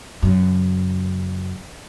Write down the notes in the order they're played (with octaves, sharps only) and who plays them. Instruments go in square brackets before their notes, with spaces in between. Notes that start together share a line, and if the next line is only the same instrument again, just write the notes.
[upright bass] F#2 C#3